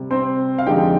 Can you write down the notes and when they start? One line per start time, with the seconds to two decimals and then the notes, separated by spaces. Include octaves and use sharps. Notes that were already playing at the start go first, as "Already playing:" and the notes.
Already playing: C3 G3
0.11 C4 C5
0.58 F5
0.66 F2 D3 G#3 C4 D#4 G4 G5